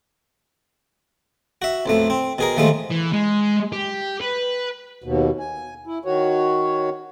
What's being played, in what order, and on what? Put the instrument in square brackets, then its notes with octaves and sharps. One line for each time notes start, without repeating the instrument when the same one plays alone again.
[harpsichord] F#4 E5
B1 F2 A3
C4
B2 G#4 A#4
D#2 F3 G#3 A3
[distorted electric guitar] E3
G#3
G4
B4
[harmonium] D#2 B2
G#5
E4
D#3 F#4 C#5